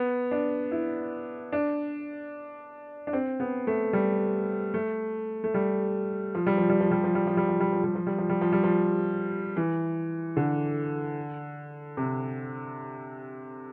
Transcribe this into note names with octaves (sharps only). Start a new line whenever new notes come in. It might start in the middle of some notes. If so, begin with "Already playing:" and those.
Already playing: B3
D4
E4
D4
D4
C4
B3
A3
G3
A3
A3
G3
F3
G3
F3
G3
F3
G3
F3
G3
F3
G3
F3
G3
F3
G3
F3
G3
F3
G3
F3
G3
F3
E3
D3
C3